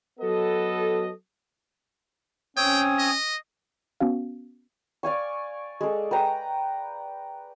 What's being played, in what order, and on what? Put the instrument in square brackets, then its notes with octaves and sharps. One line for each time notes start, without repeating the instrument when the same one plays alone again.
[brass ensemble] F#3 B3 A4 D#5
[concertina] C4 C#5 D#6 [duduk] C#4 [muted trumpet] G5
[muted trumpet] D#5
[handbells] B3 C#4 F#4 F5
[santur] D5 F5 G#5 C#6
G#3 A4
B4 G5 A#5